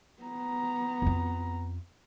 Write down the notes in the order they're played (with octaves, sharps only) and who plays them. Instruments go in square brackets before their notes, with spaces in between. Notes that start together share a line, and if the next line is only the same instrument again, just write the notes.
[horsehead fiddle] B3 A#5
[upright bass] F2 F4